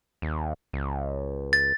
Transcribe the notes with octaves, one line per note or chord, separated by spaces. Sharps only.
D#2
C#2
A6